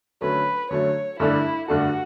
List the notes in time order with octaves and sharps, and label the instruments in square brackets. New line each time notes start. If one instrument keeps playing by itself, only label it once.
[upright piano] D3 F#3 A3 C#4 [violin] B4
[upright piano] D3 F#3 A3 C#4 [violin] C#5
[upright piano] G2 D3 A3 D4 A4 [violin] E4
[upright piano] G2 D3 A3 D4 A4 [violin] F#4